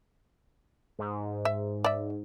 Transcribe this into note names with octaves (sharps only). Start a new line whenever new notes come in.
G#2
E5
D5 E5